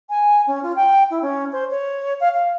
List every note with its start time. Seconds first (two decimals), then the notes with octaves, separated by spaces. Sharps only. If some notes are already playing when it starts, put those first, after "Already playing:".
0.10 G#5
0.47 C#4
0.63 F4
0.76 G5
1.11 E4
1.22 C#4
1.53 C5
1.71 C#5
2.20 F5
2.34 F5